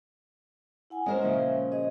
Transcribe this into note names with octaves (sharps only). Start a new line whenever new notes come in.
E4 F#5 G#5
G#3 C#4 A#4 C5 D#5
A#2 C#3 F3 E5
G#4 D#5